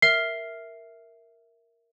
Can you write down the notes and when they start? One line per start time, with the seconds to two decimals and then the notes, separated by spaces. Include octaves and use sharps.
0.02 A#4 E5 F6 C7